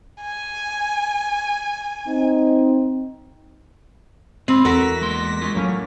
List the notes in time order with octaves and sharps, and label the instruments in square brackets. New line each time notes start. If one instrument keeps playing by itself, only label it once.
[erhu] G#5
[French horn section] C4 D#4
[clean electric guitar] G#2 F4 B5 [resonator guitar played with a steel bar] C4
[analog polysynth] E2 A#6 B6 [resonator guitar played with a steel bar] F#4 A#4 [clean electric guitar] A4
[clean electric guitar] G#3 A#3 C6
G#3 C#4 F4
[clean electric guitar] A2 [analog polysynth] F#3 A#3 C#4